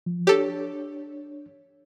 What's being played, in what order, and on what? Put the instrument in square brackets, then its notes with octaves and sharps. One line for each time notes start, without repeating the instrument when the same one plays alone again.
[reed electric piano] F3
[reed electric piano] D4 C#5 [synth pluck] G4 A4